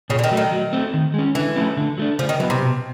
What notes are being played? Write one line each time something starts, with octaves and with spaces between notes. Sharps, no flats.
A#2 C#3
D3
D#3
F#3 A3
D#3
F#3
A3 C4
D#3
G#3 C#4
D3 E3
F3 A3 C#4 E4
D3
F#3 A3 D4
C#3 F3
D#3
E3 F#3 B3
C3
B2